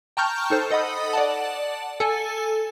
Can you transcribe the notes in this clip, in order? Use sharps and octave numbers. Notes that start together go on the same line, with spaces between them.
G5 A5 A#5 C#6 F6 G6
D#4 A4 C5
A4 D#5 F#5 B5 D#6
D5 F#5 A5
A4 G#5 A5